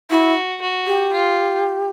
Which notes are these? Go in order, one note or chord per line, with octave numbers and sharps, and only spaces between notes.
E4 F#4
F#4
G4
F4